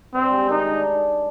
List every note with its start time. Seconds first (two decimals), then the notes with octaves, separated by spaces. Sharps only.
0.13 G2 C4
0.31 G#3
0.49 D#3 D#4
0.67 D4